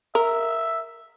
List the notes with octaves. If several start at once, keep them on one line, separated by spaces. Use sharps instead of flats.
A#4 E5